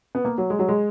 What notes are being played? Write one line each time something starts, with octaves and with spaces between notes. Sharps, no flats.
B3
A#3
F#3
G#3
F#3
G#3